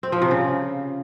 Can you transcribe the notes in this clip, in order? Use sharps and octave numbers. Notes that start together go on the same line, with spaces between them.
C4
F3
C3
C#3